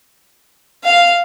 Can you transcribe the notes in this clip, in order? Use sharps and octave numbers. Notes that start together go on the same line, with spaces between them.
F5